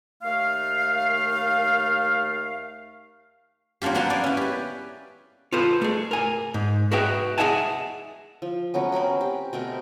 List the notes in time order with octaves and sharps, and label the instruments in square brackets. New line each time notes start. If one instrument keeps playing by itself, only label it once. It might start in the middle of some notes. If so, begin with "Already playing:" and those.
[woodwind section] D#2 A3 F5
[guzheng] F#3 A#3 D4 F4 G4
F#3 A#3 B3 F5 A5 C6
D4 D5 G5 G#5
C#4 E4
G4 B4
[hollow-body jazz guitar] F4 A4 B4 C5
A3 G#4
A#4 G#5
G#2
F#4 G#4 B4 D#5 E5 G5
G#4 D#5 E5 F#5 G#5 A5
[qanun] F3
F#3 A3 B3 C#4
C4 C#4 A#4 B5
G4
B2 A3 C4 A#4